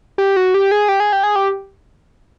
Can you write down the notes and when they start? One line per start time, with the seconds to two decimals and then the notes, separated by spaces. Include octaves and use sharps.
0.18 G4
0.36 F#4
0.54 G4
0.71 G#4
0.89 G4
1.00 G#4
1.13 G4
1.23 G#4
1.36 G4